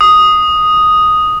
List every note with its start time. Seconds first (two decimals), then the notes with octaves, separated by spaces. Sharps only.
0.01 D#6